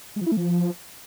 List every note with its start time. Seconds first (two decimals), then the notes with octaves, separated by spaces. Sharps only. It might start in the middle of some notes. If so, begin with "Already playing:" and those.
0.16 G#3
0.21 F3
0.26 E4
0.32 A3
0.37 F3